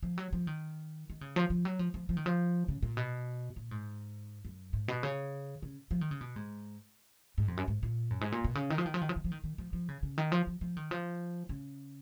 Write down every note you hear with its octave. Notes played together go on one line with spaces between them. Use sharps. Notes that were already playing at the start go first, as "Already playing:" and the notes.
F3
F#3
F3
D#3
D#3
C#3
F3
F3
F#3
F3
F3
F3
D#3
F3
C#3
A#2
B2
A#2
G#2
F#2
G#2
B2
C#3
C#3
F3
D#3
C#3
B2
G#2
G#2
F2
F#2
G#2
A#2
F#2
G#2
A#2
B2
C#3
D#3
F3
D#3
F3
D#3
F3
D#3
F3
D#3
D#3
F3
F3
C#3
C#3
D#3
F3
F3
F3
D#3
F3
C#3